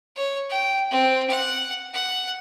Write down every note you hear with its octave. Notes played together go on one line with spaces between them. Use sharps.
C#5
G5
C4
F#5
F#5